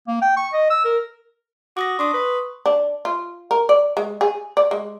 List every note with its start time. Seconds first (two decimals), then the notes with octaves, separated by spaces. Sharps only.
0.08 A#3
0.21 G5
0.36 C#6
0.53 D#5
0.70 E6
0.84 A#4
1.77 F#4 D6 D#6 A#6
1.99 D4 C6 C#6 D#6
2.14 B4
2.66 D4
3.05 F4
3.51 A#4
3.69 D5
3.97 G#3
4.21 G#4
4.57 D5
4.71 G#3